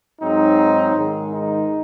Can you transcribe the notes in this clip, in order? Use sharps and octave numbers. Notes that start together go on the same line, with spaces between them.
G#2 F#3 C4 D#4
G#2 D#3 G#3
D#4